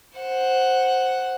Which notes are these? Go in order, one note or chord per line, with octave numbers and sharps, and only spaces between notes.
C5 F#5